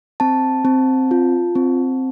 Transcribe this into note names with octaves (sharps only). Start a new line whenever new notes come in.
C4 A5
C4
F4
C4